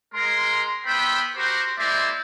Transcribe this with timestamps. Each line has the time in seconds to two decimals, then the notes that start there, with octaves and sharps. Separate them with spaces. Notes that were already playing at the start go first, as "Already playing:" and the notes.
0.14 G#3 A#4 C6
0.86 B3 B4 C5 E5 G5 B5
1.35 F#4 G4 A#4 C5
1.78 G#3 A#3 E4 C5 D5 E5